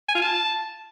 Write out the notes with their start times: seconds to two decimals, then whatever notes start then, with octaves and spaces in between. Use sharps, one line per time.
0.08 G#5
0.15 F4
0.22 A5